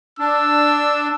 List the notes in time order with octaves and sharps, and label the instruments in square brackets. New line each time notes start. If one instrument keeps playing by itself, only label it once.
[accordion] D4 [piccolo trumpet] E6